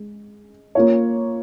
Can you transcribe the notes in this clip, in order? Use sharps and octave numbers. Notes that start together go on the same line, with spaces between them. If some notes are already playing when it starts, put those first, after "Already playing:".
Already playing: G#3
A#3 F4 C#5